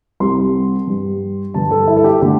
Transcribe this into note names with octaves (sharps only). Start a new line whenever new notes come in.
C2 C3 G3 C6
G2 G3
G2 D3 G3 A5
A4
E4
A4
G4
D3 A3 G4